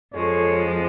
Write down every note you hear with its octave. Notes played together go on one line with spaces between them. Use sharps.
F2 F3 G#3 A4 C#5